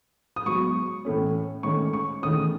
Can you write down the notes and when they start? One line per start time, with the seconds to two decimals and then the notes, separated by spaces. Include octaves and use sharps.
0.36 D#6
0.46 G#2 F#3 B3 C#6
1.05 A2 E3 A3 C#4
1.63 G#2 D#3 A3 C#4 C#6
1.93 C#6
2.22 E2 D#3 A3 C#4 D#6